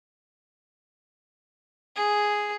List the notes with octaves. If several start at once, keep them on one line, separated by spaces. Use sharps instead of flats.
G#4